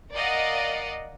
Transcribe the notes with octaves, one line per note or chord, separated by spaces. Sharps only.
A#4 D5 D#5 F5 F#5